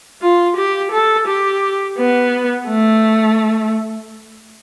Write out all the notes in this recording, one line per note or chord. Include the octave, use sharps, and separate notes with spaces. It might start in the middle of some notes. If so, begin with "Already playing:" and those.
F4
G4
A4
G4
B3
A3